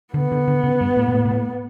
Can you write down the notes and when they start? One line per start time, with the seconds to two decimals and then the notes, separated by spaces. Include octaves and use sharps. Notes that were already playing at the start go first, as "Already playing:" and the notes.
0.14 D3 B3
0.32 D3
0.48 D3
0.64 C#3
0.81 G2
0.97 A2
1.08 A#2
1.14 A2
1.25 A#2
1.31 A2